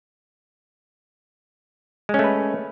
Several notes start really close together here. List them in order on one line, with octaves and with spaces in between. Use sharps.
G#3 C#4 A3 B4